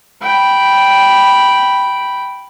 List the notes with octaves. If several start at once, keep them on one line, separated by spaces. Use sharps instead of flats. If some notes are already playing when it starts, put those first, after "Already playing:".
G5 B5